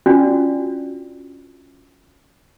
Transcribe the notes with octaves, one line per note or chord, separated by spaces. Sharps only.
C#4 D4 F4 F#4 D5